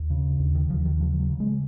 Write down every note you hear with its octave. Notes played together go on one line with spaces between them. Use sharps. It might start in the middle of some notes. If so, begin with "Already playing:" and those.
Already playing: D#2
C#3
D#2
D#3
D#2 F3
D#3
C#3 F3
F#3
C#3
G#3